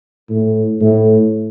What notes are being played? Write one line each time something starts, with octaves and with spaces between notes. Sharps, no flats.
A2
A2